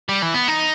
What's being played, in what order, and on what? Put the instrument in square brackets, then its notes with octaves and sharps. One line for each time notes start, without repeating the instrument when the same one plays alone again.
[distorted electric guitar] G3
E3
B3
D#4